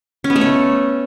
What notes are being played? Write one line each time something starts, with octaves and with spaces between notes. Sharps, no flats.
C#4
B3
A3
C#5